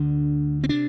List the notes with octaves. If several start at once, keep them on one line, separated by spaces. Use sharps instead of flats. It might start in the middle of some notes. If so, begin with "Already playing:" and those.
Already playing: D2 D3 D4
C4
C3 D4